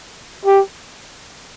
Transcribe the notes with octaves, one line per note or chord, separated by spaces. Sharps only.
G4